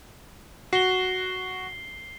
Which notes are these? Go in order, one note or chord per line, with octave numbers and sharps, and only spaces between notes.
F#4 C7 G7